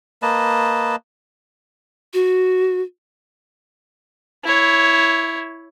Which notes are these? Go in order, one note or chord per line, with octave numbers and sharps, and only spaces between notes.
A#3 B4 D#5 A5
F#4
E4 C#5